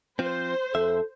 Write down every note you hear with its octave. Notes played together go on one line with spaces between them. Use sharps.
F3 C4 C5
F2 A4 E5